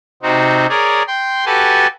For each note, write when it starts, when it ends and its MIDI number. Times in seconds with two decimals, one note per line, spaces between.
0.23 0.67 48
0.23 0.67 60
0.23 0.67 63
0.23 0.67 66
0.69 1.03 68
0.69 1.03 70
0.69 1.03 73
0.69 1.03 74
1.07 1.45 79
1.07 1.45 84
1.46 1.87 66
1.46 1.87 67
1.46 1.87 69
1.46 1.87 71
1.46 1.87 80
1.46 1.87 81